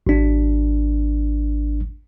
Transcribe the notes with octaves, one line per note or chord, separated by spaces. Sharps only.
G#1 D4